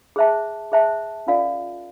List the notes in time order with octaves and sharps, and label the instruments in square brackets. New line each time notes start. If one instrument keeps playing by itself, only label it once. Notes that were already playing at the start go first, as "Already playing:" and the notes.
[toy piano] G#4 C5 E5 A5
G#4 C5 E5 A5
C#4 F4 A#4 D5 F5